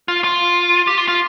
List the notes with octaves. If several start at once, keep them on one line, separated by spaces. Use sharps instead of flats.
F4
F4
G4
F4
F4